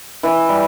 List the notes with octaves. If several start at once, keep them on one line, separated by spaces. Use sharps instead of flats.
E3
G3